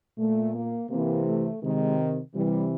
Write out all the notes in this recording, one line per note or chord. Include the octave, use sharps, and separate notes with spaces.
A#2 A3
A#3
C3 E3 A#3
A3
C3 D#3 G#3
C3 E3 G3